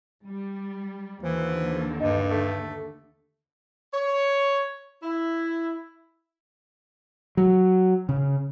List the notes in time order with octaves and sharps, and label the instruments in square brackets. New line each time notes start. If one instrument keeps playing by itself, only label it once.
[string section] G3
[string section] D#2 D3 [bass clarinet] E3 [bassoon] F3
[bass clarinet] G2 [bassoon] D#4
[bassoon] A3
[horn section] C#5
E4
[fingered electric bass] F#3
C#3